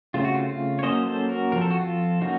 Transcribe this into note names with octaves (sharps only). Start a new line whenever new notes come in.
C#3 A3 C4 F4
F#4
F4
F4
C#5
F#3 A#3 C#4 C5 D#5
A4 C5
F#4 A#4
F3 C4 A#4
A4
F#4
F4 A4
F#3 A#3 C#4 D#4 F#4